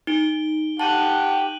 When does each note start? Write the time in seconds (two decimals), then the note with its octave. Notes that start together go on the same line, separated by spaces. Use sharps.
0.07 D#4 D7 G7
0.79 G4 F#5 G5 A5 F#6 D#7 F#7